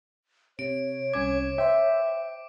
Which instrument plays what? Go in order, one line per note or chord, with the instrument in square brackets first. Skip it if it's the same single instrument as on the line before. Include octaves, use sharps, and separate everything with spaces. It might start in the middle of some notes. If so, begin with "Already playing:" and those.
[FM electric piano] C3 [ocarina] C#5 [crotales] D7
[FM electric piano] C2 C#4 G#6 [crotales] D6
[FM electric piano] C5 G5 [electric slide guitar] E5